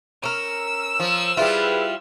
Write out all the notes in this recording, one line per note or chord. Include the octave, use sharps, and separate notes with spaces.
C#4 A#4 E6
F3
G3 E4 F4 G#4 B4